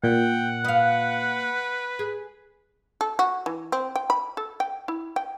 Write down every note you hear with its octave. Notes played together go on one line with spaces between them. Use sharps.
A#2 F#5 G5
B4 D#5 F5
G#4
A4
F#4
E3
C4
G5
B5
A4
G5
E4
G5